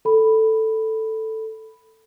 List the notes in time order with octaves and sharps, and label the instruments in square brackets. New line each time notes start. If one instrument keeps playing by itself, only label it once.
[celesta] A4 B5